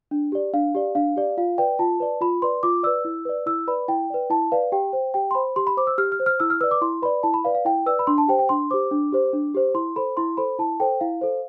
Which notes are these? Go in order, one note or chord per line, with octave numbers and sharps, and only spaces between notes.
D4
G4 D5
D4 F5
G4 D5
D4 F5
G4 D5
F4 F5
B4 D5 G5
F4 A5
B4 D5
F4 B5
B4 D5 C6
F4 D6
B4 D5 E6
E4
B4 D5
E4 E6
B4 D5 B5
E4 G5
B4 D5
E4 A5
B4 D5 F5
G4 G5
C5
G4 G5
C6
C5 B5
G4 C6
B5
C5 D6
E6
G4 F6
F6
C5
F6
E4 E6
F6
B4 D5 E6
D6
E4 C6
B4 D5 B5
E4 A5
B5
B4 D5 F5
F5
E4 G5
B4 D5 E6
B5
D4 C6
A5
G4 C5 G5
G5
D4 C6
G4 C5 D6
D4
G4 C5
D4
G4 C5
E4 C6
A4 C5 B5
E4 C6
A4 C5 B5
E4 A5
A4 C5 G5
E4 F5
A4 C5